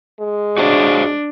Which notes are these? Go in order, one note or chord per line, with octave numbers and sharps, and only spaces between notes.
G#3
D4 F#4 C5 C#5